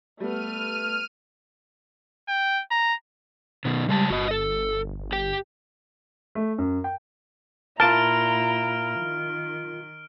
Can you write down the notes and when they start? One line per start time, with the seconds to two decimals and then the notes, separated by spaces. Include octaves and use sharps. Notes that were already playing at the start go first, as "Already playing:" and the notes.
0.20 G3 A3 B3 F6 D#7
2.28 G5
2.71 A#5
3.65 B2 D#3
3.89 C#3 G3 G#3 A5
4.10 G1 F#4 D#5
4.31 A4
4.98 G1
5.13 G4 G5
6.35 A3
6.58 F#2
6.84 G5
7.80 A#2 E4 F4 A#4 A5 A#5 F6 D7
8.98 D#3